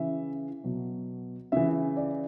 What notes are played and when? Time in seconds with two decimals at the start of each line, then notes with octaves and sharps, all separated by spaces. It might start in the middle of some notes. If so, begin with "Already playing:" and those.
Already playing: C#3 E3 E5
0.64 B2 F#3
1.52 C#3 E3 E5
1.97 D5